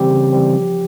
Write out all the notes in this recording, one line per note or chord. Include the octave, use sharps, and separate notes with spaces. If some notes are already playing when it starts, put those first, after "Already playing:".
Already playing: C#3 E3 G3 C4 G4
C#3
E3 G3 C4
F3